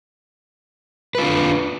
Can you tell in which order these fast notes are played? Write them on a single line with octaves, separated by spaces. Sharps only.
B4 F4 D4